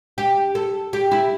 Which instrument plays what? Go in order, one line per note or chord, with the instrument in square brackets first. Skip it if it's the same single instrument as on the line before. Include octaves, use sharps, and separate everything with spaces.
[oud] G4
A4
G4
E4